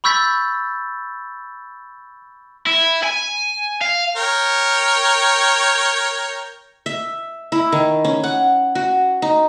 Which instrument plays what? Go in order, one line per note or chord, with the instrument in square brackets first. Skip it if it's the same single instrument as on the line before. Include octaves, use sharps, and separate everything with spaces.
[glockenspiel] B5 C#6 E6 G6 A6 B6
[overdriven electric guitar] E4
G#5
F5
[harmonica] A#4 C#5 G5
[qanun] E5
E4
D#3
C#4
F#5
F#4
D#4